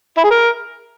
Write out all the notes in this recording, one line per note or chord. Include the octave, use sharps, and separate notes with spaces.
E4
G#4
A#4